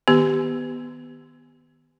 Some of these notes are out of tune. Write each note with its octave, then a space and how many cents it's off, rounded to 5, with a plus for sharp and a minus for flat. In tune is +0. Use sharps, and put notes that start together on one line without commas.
D#3 +0 B3 +0 G4 +0